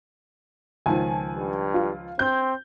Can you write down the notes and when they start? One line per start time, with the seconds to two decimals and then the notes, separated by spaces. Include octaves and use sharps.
0.86 C#2 D#3 F3 G#5 A5
1.35 G2
1.74 F4
2.19 C4 G6